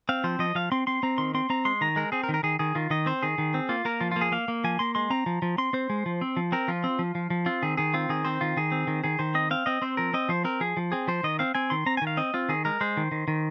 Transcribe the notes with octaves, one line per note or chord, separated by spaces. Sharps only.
C4 F5
F3 C5
F3 D#5
F3 F5
C4 C6
C4 C6
C4 A#5
D#3 C6
C4 C6
C4 A#5
G#3 C6
D#3 A#5
G#3 A#4
C4 G#4
A#4
D#3
A#4
D#3 G#4
D#3 G#4
D#3 F4
D#3 D#5
C4 C5
D#3 G#4
D#3
C4
A#3 F4
A#3 A#4
F3 F4
A#3 F4
G#4
A#3 F5
A#3
F3 G#5
A#3 C6
G#3 C6
C4 A#5
F3
F3
C4 C6
C4 C5
G#3
F3
C4
F3
C4 A#4
F3 F4
C4
F3
F3
F3
C4 F4
D#3 G#4
D#3 G#4
C4 F4
D#3 G#4
C4 C5
D#3 F4
D#3 G#4
C4
D#3
D#3 G#4
D#3 C5
C4 D#5
C4 F5
C4 D#5
C4 C5
F3 A#4
C4 D#5
F3 C5
C4 A#4
F3 G#4
F3
C4 G#4
F3 C5
D#3 D#5
C4 F5
C4 G#5
D#3 C6
C4 A#5
G#5
D#3
F5
C4 D#5
C4 F4
D#3 G#4
G#3 A#4
G#3 C5
D#3
D#3
D#3